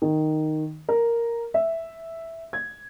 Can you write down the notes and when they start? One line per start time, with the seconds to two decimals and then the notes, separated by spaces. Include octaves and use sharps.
0.02 D#3
0.89 A#4
1.54 E5
2.53 G#6